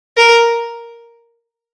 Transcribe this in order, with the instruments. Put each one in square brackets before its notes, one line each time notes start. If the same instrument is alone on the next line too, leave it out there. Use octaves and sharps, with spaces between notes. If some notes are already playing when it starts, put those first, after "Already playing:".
[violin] A#4